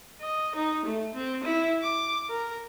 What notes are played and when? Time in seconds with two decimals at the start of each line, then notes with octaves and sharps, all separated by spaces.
0.21 D#5
0.55 D#4
0.85 A3
1.15 C4
1.43 E4
1.82 D6
2.29 A#4